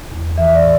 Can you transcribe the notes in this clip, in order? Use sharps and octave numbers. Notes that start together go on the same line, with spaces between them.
E2
E3 E5
D5
A2